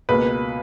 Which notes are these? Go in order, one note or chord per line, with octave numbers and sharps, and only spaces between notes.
C#2 B2 A#3 B4